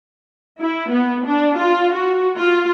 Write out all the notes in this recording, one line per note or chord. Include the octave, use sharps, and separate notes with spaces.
E4
B3
D4
F4
F#4
F4